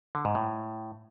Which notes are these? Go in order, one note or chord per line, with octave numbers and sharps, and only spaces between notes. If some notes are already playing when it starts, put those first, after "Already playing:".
D3
G#2
A2